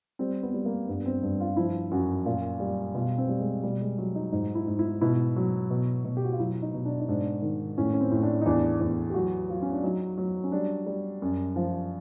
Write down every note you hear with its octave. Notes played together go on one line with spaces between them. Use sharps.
G3 C4
B3
G3
A#3
G2 B3
C4
G2
F4
F3 E4
F#2 F#4
A#2 F4
G3
B2 F4
C4
G3
G#3
B2 G3
G#3
F#3
D#4
G#2 D#4
E4
G#2
E4
B2 E4
F#3
B2
B2
G4
F#4
F4
F#3 E4
D#4
B2
D4
D#4
G#2 D4
D#3
A2 C#4
C#4
C4
A2
D4
D#4
E2 D4
E2
G4
F#3 F#4
F#3 F4
C#4
D4
F#3 D#4
F#3
C#4
G3 D4
G3
F#2
F3